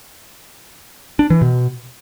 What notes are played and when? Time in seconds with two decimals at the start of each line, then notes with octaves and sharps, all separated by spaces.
1.19 D4
1.30 E3
1.42 B2